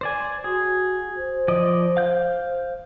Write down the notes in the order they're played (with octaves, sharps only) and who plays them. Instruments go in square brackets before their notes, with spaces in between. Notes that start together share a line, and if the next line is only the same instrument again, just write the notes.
[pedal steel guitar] C5 D5 G#5
[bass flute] F#4 [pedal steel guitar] G#4
[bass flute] C5
[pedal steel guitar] F3 D5 D#5
F5 G6